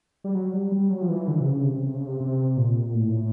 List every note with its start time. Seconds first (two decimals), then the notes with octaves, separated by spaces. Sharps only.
0.24 G3
0.35 F#3
0.54 G3
0.72 G3
0.90 F#3
1.02 F3
1.09 E3
1.28 D3
1.41 C3
1.46 C#3
1.65 C3
1.83 C3
1.95 C#3
2.07 C3
2.20 C3
2.57 A#2
2.94 A2